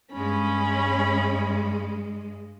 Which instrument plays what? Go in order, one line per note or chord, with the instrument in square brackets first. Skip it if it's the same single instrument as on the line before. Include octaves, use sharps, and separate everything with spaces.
[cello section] G2 G#3 [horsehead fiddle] C#4 B5